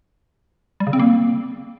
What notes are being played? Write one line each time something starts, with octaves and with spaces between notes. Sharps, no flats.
G3
C#3
C4
A#3